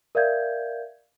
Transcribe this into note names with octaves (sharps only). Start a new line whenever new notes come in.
A#4 D5 E5 F5 G6 G#6